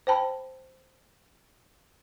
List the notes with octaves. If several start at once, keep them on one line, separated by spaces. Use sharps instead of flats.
C5 G5 A5 B5